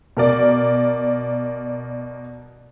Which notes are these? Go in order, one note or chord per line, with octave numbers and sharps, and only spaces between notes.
B2 A#4 D5